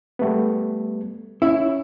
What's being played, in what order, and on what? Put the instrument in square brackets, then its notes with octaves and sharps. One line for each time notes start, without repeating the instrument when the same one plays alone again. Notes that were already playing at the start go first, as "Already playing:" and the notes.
[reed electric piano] G3 A3 B3
[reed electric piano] C#4 [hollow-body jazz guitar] E4